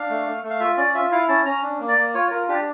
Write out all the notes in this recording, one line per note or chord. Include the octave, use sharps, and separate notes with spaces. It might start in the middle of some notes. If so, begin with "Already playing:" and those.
Already playing: D4 F5
A3
A3
A3
F5
F4 E5
C#4 D5
F4 E5
E4 F5
C#4 A5
C#4 A#5
D4
A#3
D5
A#3
F4 C#5
F4 A#4
D4 G4